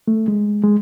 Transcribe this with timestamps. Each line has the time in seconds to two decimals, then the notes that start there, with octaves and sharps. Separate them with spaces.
0.08 A3
0.28 G#3
0.63 G#3